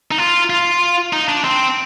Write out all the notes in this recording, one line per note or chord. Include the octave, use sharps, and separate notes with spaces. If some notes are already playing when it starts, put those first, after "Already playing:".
D#4
F4
F4
D#4
D4
C4